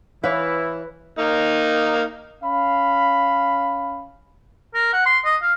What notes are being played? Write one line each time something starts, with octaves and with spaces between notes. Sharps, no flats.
E3 E4 B4 C#5 E5 F5
A#3 D#4
C#4 F5 B5
A#4
F#5
C6
D#5
F5